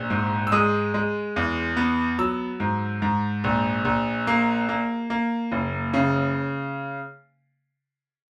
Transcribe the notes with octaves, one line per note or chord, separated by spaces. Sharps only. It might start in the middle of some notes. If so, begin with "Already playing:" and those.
Already playing: A#1
G#2
E6
G#3 D#6
G#3
E2
B3
F#3 E6
G#2
G#2
A#1
A#1
A#3
A#3
A#3
F#1
C#3